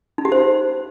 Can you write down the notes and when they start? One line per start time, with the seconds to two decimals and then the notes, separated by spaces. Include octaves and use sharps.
0.18 D#4
0.25 G4
0.32 C5